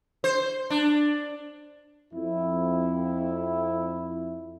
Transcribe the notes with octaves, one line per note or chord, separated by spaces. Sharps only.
C5
D4
F2 E4